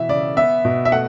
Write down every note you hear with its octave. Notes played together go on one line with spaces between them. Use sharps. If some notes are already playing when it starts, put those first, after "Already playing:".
Already playing: B2 E3 E5
C#3 D5
B3 E5
B2
E5
A3 F#5